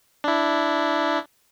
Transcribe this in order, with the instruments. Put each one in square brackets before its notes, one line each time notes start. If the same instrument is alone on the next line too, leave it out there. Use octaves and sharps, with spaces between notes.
[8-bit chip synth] D4 E4